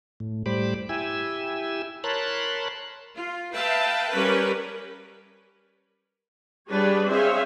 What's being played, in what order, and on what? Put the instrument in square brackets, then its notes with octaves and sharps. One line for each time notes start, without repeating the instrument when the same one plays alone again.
[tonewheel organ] A2
A2 G3 C5 B5 D6
E4 G4 G#5 E6
A#4 C#5 A5 B5 C6 F#6
[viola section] F4
B4 E5 F5 G5 A5
G3 C#4 A#4 B4
G3 D4 G#4 B4 C#5
C4 G#4 C5 C#5 E5 F5